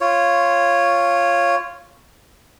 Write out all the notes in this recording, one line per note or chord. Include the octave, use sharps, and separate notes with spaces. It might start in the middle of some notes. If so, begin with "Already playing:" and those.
F4 C#5